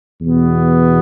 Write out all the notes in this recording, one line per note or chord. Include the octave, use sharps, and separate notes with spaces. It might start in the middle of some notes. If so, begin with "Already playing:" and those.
E2 B2 B3